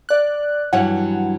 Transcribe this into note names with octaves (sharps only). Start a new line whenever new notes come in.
D5 F#6
G2 E3 F#3 F#5